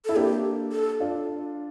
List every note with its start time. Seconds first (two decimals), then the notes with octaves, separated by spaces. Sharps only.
0.05 E4 A4
0.16 A#3 D4 G4
0.72 A4
1.00 D4 F4